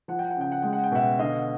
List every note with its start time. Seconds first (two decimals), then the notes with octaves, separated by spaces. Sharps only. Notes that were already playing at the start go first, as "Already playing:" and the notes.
0.08 F3 F#5
0.19 G5
0.30 F#5
0.37 C#3 G5
0.52 F#5
0.62 G#3 G5
0.73 F#5
0.84 G5
0.92 B2 E5 F#5
1.19 D3 D#5 F5